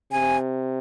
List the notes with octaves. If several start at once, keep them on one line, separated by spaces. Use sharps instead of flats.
C3 G#5